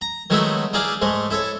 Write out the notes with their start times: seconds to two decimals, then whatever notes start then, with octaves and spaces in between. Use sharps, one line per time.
0.02 A#5
0.30 D#3 F#3 G#3 A3 B3 E4
0.73 D#4 E4 G#4 D5 F5
1.02 G#2 G#3 A3
1.31 E4 A4 C#5